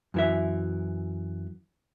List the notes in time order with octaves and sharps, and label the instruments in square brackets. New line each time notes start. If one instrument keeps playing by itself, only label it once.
[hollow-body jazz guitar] F#2 E3 E5